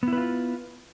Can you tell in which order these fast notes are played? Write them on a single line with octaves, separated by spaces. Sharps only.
B3 E4 B4 F4